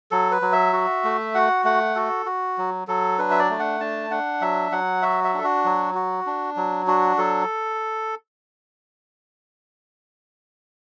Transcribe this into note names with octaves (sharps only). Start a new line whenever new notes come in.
F#3 A4
B4
F#3
E5
F#4
A3
F#4 F#5
A3 F#5
F#4 A4
F#4
F#3
F#3 A4
D4 B4
E5
D5
A3
F#5
D4 A5
D4 F#5
F#3 E5
F#3 F#5
F#4 E5
E5
D4 A4
F#4
F#3
F#4
D4
F#3
D4 F#4
F#3 A4